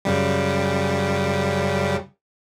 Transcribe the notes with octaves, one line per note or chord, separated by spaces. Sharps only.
F#2 C#3 G3